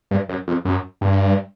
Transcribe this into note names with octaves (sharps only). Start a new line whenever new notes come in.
G2
F#2
F2
F#2
G2